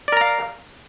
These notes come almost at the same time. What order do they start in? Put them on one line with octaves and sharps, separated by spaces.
D5 A#4 A#5 F5